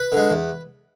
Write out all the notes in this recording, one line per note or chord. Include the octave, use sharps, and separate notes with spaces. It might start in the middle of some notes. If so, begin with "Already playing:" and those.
Already playing: B4
D3 G#3
E2